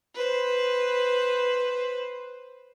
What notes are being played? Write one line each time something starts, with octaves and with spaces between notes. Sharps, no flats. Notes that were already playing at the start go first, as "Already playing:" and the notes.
B4 C5